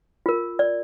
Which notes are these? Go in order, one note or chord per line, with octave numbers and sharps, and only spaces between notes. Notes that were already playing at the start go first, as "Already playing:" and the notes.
F4 A#4
D5